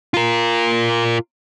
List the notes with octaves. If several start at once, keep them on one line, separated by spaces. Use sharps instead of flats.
F4 A#4